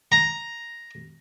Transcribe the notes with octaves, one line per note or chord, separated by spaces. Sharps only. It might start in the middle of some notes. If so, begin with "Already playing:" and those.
A#5